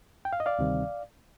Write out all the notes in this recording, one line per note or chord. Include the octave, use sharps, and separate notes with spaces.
G5
F5
D#5
D5 F5
D2 C3 D#3 G3 C4